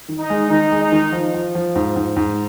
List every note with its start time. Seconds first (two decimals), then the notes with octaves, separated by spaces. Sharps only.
0.09 D#3
0.19 D#4
0.30 G#3
0.50 D#3 D#4
0.72 G#3
0.82 D#4
0.92 D#3
1.12 F3
1.34 F3
1.55 F3
1.75 G#2
1.96 G#2
2.16 G#2